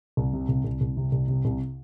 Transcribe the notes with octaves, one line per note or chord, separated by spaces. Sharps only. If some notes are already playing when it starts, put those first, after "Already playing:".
C2
C3
C2
C2
C2
C3
C2
C3
C2